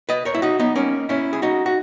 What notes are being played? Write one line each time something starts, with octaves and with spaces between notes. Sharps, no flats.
B4 D#5
A#4 C#5
E4
D#4 F#4
B3 D#4
A#3 C#4
C#4 E4
G#4
D#4 F#4
F#4